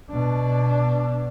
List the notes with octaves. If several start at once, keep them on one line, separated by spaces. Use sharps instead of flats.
B2 D4